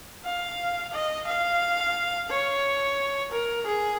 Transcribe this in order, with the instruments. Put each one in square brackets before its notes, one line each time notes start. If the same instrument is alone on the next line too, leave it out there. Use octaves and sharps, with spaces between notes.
[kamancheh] F5
D#5
F5
C#5
A#4
G#4